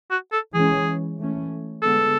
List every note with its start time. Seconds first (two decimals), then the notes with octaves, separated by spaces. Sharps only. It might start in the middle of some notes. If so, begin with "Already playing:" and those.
0.10 F#4
0.32 A4
0.54 E3 G#3 C#4 G#4
1.18 E3 A3 C#4
1.82 D3 G#3 B3 A4